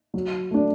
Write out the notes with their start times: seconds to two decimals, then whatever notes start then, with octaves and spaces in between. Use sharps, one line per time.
0.14 F#3
0.51 A3 D4